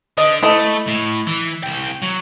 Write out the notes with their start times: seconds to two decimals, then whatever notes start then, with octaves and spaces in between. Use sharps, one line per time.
0.18 D3 D4 D#5
0.43 A3 E4 A4 D#5
0.87 A2
1.27 E3
1.63 C2 G5
2.02 F#3